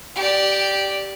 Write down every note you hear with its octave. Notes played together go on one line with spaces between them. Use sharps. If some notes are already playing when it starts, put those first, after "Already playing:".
G4 D5